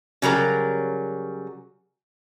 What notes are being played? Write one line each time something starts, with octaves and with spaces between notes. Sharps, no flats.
C#3 F#3 G3 A#4